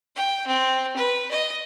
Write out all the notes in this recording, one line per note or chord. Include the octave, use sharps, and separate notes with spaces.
G5
C4
B4
D#5